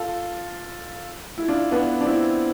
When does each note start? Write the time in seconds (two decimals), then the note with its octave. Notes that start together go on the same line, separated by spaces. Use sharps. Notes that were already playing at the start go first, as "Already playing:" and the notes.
Already playing: F4 A4
1.38 E4
1.48 D4 F4
1.71 B3 D4
2.01 D4
2.06 C4 E4